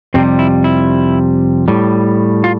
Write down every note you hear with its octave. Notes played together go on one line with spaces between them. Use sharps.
F2 C3 G3 C4
E4
E4
A2 G3
F4